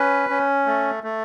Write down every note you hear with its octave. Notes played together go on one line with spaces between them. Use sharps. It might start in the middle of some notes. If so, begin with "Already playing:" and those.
Already playing: C#4 B4
C#4
A3
A3